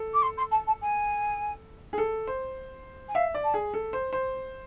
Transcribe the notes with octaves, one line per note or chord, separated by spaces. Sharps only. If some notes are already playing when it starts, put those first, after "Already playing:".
Already playing: A4
D6
C6
C6
A5
A5
G#5
G#4
A4
C5
G#5
E5 F5
D5
A5
G#4
A4
C5
C5